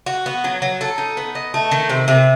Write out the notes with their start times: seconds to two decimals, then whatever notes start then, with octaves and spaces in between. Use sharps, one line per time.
0.06 F#4
0.26 B3
0.44 F#3
0.62 F#3
0.81 A4
0.98 D#4
1.17 B3
1.35 D#5
1.54 A3
1.71 D#3
1.89 C3
2.08 C3